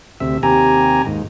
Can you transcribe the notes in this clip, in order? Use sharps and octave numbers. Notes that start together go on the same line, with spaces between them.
D2 C3 E5
D#2 C3 G4 G#5 A#5
D#2 G#2